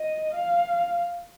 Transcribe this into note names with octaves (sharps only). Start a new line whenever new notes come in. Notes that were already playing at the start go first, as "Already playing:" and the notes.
Already playing: D#5
F5